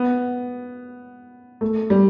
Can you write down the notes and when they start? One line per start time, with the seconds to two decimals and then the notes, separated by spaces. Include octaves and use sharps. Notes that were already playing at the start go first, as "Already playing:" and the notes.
Already playing: B3
1.61 A3
1.90 G3